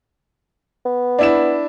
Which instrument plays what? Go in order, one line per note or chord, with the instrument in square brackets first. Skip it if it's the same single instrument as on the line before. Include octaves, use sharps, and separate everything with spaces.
[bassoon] B3
[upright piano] D4 E4 E7